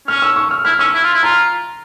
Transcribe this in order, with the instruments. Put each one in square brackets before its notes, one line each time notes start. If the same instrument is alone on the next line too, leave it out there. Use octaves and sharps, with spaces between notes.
[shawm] C#4 [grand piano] F6
[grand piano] E6
C#6
F6
[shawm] E4 [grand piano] F6
[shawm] C#4 [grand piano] E6
[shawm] E4
F4
E4
[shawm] F4 [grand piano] A#5